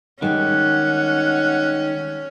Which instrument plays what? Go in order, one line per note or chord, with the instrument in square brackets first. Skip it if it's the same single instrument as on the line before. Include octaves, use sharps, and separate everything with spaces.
[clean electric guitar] D#3 [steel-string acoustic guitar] G3 G#3 [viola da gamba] C#4 [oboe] F#5